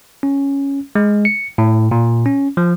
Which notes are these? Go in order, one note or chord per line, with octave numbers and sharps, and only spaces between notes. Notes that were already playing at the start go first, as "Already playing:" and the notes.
C#4
G#3
C#7
A2
A#2
C#4
F3